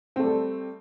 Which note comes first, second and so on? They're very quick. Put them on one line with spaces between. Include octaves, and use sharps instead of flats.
C4 A3 G3 A4